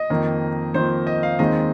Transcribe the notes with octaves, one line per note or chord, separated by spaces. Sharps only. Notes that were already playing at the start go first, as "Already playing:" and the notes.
Already playing: D#5
F2 D#3 A#3
F2 D#3 A#3 C5
D#5
F5
D#2 D#3 G#3 C4 D#4 D#5